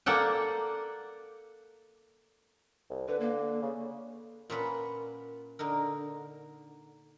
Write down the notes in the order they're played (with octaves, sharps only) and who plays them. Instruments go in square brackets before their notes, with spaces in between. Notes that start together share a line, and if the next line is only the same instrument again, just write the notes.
[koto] A#3 A4 D5 F#5 G5
[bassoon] C2
[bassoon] D3 [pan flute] B4
[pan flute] A#3
[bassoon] C#3
[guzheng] A#2 C#4 B4 F#5
D3 D#4 A#4